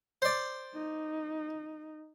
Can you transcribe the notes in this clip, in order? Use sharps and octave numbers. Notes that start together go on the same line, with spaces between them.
C5 D5
D#4